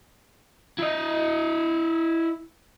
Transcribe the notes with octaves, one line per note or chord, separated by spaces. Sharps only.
E4 D#5